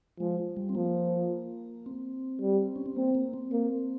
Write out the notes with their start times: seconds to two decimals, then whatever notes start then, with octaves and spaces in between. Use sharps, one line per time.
0.20 F3 G#3
0.57 G3
0.69 C4
0.75 F3 A#3
1.86 C4
2.41 G3
2.76 C#4
2.86 C4
2.96 A#3 C4
3.15 A#3
3.34 C4
3.52 A#3